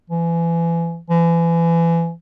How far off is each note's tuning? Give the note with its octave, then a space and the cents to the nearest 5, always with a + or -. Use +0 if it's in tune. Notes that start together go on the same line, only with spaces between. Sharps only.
E3 +30
E3 +30